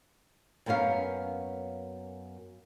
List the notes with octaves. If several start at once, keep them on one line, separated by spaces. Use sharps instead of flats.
F#2 A#3 B3 C#4 F5